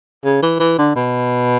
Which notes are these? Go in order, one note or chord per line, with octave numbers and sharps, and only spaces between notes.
C#3
E3
E3
D3
B2